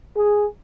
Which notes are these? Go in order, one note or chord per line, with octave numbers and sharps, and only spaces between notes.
G#4